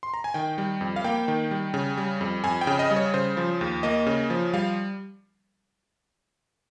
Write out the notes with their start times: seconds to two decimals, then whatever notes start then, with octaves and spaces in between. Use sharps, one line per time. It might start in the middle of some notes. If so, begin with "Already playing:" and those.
0.03 C6
0.14 A#5
0.24 G#5
0.34 D#3 G5
0.58 G3
0.81 F2
0.96 F5
1.04 A#3 G5
1.28 D#3
1.51 G3
1.74 C#3
1.97 G3
2.21 F2
2.44 F2 G#5
2.61 G5
2.67 C#3
2.79 D#5
2.91 G3
2.96 C#5
3.14 C#3 C5
3.37 F3
3.61 D#2
3.83 A#3 D#5
4.06 C#3
4.30 F3
4.53 G3 F5